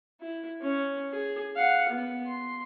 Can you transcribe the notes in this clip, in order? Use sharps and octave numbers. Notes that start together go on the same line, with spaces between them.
E4
C#4
G#4
F5 F#5
B3
C6